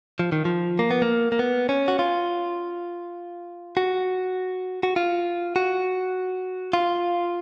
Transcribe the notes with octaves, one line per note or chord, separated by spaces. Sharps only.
F3
D#3
F3
A#3
B3
A#3
A#3
B3
C#4
F#4
F4
F#4
F#4
F4
F#4
F4